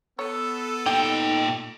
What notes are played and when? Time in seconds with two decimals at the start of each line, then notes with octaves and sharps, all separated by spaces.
0.19 B3 A4 C#5
0.86 A#2 D#4 G4 G5